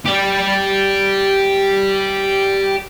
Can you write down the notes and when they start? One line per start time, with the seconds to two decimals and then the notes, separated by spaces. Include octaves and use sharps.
0.06 G4 D5